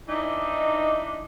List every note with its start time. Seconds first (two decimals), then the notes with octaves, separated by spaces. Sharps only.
0.09 E3 D4 D#4